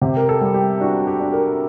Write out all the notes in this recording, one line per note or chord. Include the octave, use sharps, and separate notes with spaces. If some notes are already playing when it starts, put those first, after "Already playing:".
C3 G4
A#4
A4
G3
G4
D4 F#4
G4
D4
A#4